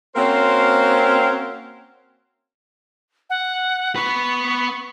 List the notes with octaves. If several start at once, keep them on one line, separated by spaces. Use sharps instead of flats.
A#3 C4 C#4 F#4 A#4 C5
F#5
B3 B4 C#6